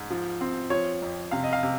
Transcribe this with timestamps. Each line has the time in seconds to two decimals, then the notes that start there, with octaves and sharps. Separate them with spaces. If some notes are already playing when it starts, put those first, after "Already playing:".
Already playing: G#2
0.10 F3
0.41 C4
0.70 F3 C#5
1.02 F2
1.31 C3 F5
1.43 D#5
1.53 F5
1.63 C3